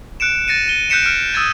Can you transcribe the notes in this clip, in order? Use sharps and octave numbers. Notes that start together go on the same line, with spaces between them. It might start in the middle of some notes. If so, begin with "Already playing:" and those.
F#6 C#7 D7 E7
A6 A#6 C#7 D#7
D#7 G7
F#6 G6 B6 C#7 E7
F6 D7
D#6 E6 F#6 G#6 A6 D#7